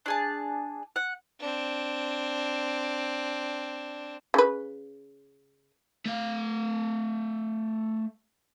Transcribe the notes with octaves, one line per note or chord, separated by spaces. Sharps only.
D4 G#4 A5
F#5
C4 D4
C#3 B4
A3 F5